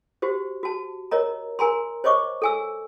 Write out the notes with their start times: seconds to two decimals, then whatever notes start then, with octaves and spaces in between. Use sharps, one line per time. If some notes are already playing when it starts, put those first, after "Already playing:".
0.22 F#4 G4 C5
0.63 F#4 A5
1.11 A#4 C#5 D#5 A#5
1.59 A#4 G#5 A#5 C6
2.04 C5 C#5 D#5 C#6 D6
2.42 A4 G#5 E6